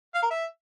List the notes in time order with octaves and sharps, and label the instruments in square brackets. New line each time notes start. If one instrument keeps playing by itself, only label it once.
[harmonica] F5
A#4
E5